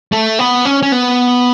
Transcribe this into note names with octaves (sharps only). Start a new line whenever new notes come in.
A3
B3
C#4
C#4
B3